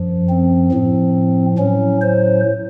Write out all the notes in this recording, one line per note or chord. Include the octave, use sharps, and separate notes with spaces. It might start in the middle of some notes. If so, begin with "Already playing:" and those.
Already playing: F#2 F3
C4
A2 F3
A2 F#3 C#4
C5